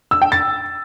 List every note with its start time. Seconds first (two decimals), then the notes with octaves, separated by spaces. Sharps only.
0.11 E6
0.22 G5
0.32 A6